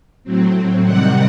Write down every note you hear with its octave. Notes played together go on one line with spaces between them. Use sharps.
A2 F#3 C4
C3 D#3 G3 C4 F#5